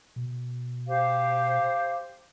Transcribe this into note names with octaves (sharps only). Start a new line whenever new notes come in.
B2
G4 C5 F5